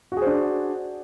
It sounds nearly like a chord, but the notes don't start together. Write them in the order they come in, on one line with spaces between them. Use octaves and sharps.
F#4 G#4 C5 D4